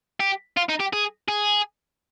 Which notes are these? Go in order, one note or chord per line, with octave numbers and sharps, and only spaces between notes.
G4
F4
D#4
G4
G#4
G#4